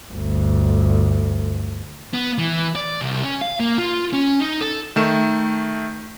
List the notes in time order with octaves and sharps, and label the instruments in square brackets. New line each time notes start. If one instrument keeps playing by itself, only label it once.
[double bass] G1 D2
[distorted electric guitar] B3
E3
D5
C2
C#4
F5
A#3
F4
C#4
D#4
A4
[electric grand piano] D#3 A3 E7